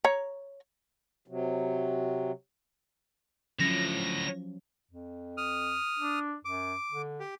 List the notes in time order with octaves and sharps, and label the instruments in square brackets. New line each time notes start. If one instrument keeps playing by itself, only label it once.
[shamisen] C#5 A#5
[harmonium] C3 F#3
[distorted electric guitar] A2 D3 [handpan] F3 F#3 C#4 [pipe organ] A#6
[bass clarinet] F2
[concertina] D#6 F6
[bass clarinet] D4
[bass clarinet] F#2 [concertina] D6
[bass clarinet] D3
[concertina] G4